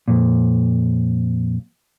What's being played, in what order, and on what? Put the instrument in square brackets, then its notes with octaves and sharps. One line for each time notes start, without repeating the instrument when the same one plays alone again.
[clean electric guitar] F2 A#2